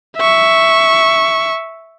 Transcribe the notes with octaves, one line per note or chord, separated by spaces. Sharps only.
E5 C#6